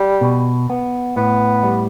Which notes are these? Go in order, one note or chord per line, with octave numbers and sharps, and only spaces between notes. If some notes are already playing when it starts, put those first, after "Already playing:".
Already playing: G3
B2
B3
A2 B3
G3